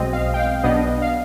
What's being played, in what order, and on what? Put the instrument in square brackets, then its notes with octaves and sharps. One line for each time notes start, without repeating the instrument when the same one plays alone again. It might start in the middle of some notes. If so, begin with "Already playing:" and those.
Already playing: [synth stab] B1 B2 G#3 C4 D#5
F5
G5
F5
B1 B2 B3 D4 D#5
F5